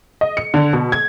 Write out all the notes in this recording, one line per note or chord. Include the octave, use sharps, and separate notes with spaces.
D#5
C#7
D3
B2
G#6